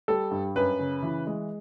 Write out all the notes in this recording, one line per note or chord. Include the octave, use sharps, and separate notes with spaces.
G3 A4
G2
F#2 B4
C#3
E3
G#3